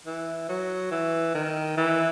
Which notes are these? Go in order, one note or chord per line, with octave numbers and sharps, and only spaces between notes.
E3
F#3
E3
D#3
E3